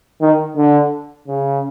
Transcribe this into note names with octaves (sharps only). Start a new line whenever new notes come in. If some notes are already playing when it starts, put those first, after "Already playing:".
D#3
D3
C#3